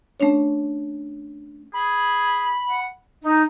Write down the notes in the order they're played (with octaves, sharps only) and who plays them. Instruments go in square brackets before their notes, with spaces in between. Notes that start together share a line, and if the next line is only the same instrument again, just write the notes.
[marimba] A3 C#4 D4 C#5
[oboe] G#4 [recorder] B5
[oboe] F#5
[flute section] D#4